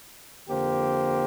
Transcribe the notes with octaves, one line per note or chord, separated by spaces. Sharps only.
F2 D3 A#3 G4 C5